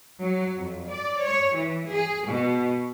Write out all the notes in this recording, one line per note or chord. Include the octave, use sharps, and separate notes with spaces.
F#3
F2
D5
C#5
E3
G#4
B2